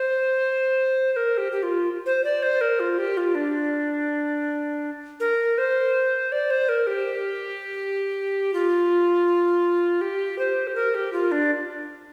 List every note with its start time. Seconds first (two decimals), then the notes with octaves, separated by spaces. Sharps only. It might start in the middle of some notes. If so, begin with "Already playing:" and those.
Already playing: C5
1.13 C5
1.16 A#4
1.38 G4
1.52 G4
1.63 F4
2.06 C5
2.24 D5
2.43 C5
2.61 A#4
2.80 F4
2.98 G4
3.17 F4
3.35 D4
5.20 A#4
5.58 C5
6.32 D5
6.50 C5
6.69 A#4
6.87 G4
8.54 F4
10.01 G4
10.38 C5
10.67 G4
10.75 A#4
10.95 G4
11.13 F4
11.32 D4